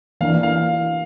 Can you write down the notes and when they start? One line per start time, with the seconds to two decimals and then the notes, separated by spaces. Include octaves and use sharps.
0.21 E3 A#3 D4 F5
0.43 F5